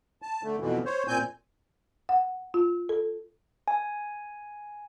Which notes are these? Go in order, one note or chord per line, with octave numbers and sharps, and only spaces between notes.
A5
D3 A3
F2 B2 D3 E3
C5 C#5
A#2 C4 G#5 G6
F#5
F4
A4
G#5